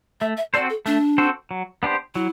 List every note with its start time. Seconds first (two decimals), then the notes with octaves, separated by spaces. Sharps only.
0.21 A3 E5
0.37 E5
0.54 C4 F#4 A4 C5 D5
0.70 A4
0.86 A3 D4
1.18 C4 F#4 A4 C5
1.51 F#3
1.83 B3 D4 G4 C5
2.15 F#3 E4